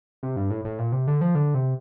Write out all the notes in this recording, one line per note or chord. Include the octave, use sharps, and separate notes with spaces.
C3
G2
A2
A2
A#2
C3
D3
F3
D3
C3